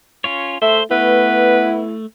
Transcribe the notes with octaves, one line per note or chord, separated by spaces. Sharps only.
C#4 F4 C#5
A3 C5 E5
A3 B3 E4 B4